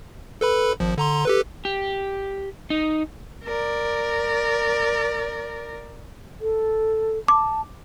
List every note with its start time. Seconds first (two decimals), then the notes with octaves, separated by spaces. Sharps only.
0.41 A4 B4 B5
0.80 G#1 F3
0.98 D3 A#5 C6
1.25 G4 A4 B4
1.65 G4
2.70 D#4
3.45 A#4 D5
6.41 A4
7.28 A5 D6